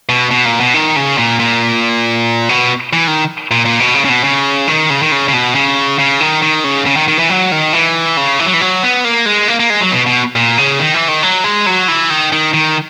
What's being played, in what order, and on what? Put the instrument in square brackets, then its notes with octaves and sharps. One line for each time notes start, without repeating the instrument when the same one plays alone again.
[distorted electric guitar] B2
B2
A#2
B2
D#3
C#3
A#2
A#2
B2
E3
D#3
A#2
A#2
B2
C#3
C#3
B2
C#3
D#3
C#3
D#3
C#3
C#3
B2
C#3
C#3
D#3
D#3
C#3
C#3
D#3
D#3
E3
F#3
D#3
E3
C#3
E3
F#3
E3
F#3
B3
A#3
G#3
A#3
A#3
G#3
F#3
B2
B2
A#2
C#3
D#3
E3
D#3
F#3
G#3
F#3
E3
D#3
D#3
D#3